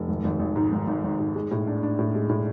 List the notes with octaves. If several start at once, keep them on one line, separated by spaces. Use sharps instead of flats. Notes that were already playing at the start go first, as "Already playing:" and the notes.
Already playing: F1
G#1
G#1
G#1
G#2
G#1
G#1
G#1
G#2
G#3
A2
D4
D4
A2
G#3
A2